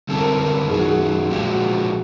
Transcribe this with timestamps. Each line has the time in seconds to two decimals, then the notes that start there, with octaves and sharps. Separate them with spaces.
0.09 D3 G3 C4 E4 G4 A4
0.19 A#4
0.28 B4
0.39 A#4
0.54 B4
0.69 F#2 D#3 F#3 G#4
0.79 F#4
0.90 G#4
1.30 A#2 F3 G#3 G4
1.45 F#4